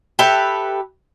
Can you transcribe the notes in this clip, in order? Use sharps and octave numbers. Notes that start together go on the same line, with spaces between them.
G4 A4 B4 E5